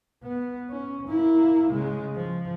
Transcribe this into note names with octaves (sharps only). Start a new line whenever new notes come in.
B3
C#4
A#3 E4
C#3 G#3
F3